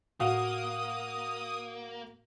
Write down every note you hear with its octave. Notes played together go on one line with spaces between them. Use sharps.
A2 A#3 F#4 F5 D#6